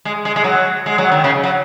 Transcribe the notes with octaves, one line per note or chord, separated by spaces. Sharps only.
G#3
G#3
G#3
F#3
G#3
F#3
D#3
C#3
F#3